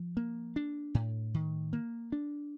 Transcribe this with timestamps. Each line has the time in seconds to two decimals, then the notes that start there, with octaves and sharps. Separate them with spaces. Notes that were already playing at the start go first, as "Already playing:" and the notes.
Already playing: F3
0.17 A#3
0.56 D4
0.95 A2
1.34 D#3
1.73 A#3
2.12 D4